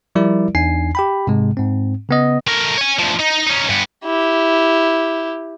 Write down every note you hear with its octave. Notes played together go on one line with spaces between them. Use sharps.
F3 G3 E4 A#4 D5
E2 D4 D#4 G#5 C7
G4 G5 B5
G#2 C3 G#3
G#2 C4
C#3 B3 D#5
A3 A#4
C#5 G#5
D2 F3
D#4
C#4 D#4
G2 B3
E4 G4